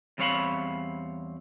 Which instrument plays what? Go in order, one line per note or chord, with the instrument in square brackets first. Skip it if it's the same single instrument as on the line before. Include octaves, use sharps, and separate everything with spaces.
[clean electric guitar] E2 G3 C4 C#5 F5 B5